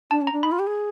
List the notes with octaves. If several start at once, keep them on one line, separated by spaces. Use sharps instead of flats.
D4 A5
C#4
A#5
D4
D#4 B5
F4
G4
G#4